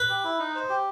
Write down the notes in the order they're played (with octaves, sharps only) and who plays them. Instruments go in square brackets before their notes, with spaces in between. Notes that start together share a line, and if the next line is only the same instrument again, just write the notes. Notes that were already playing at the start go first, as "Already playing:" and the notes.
Already playing: [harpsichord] B4
[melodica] G4
E4
D#4
C5
G4